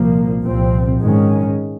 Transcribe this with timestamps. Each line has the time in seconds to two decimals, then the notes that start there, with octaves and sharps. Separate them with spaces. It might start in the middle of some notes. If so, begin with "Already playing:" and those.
Already playing: C2 A#2 F3 A#3
0.44 C2 A#2 F3 C4
1.01 G#2 D#3 G#3 C#4